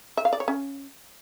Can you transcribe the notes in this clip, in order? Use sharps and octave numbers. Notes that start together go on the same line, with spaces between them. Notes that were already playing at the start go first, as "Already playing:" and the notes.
E5
F5
D5
C#5
C#4